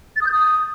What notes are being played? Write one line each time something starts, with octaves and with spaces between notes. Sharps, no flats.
A6
D#6
G6
D#6